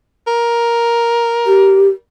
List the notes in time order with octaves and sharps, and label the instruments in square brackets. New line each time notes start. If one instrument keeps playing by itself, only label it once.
[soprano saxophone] A#4
[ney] G4